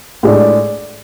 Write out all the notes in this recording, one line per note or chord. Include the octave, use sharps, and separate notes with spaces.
A2 G#3 D4